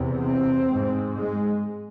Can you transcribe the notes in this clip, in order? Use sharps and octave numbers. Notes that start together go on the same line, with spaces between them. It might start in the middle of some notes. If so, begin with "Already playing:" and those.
Already playing: E2 C3
C4
G#2
G#3